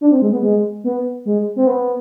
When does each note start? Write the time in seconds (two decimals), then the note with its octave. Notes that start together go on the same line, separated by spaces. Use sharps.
0.01 D4
0.11 C4
0.22 G#3
0.33 B3
0.43 G#3
0.84 B3
1.25 G#3
1.56 C4
1.67 B3